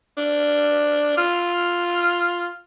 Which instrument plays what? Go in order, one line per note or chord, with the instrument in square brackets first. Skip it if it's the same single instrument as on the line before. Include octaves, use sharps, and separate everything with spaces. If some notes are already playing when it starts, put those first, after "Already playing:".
[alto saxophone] D4
F4